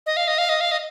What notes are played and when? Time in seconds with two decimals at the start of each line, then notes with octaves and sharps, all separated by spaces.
0.06 D#5
0.17 F5
0.28 D#5
0.38 F5
0.49 D#5
0.61 F5
0.71 D#5